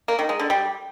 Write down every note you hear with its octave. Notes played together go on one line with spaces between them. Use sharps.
A#3
D#3
G#3
D3
G3